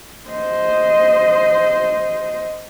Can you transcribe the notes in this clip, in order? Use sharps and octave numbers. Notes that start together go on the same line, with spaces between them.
C5 D#5